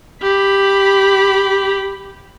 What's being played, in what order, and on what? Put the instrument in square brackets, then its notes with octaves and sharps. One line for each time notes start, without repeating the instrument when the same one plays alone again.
[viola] G4 B5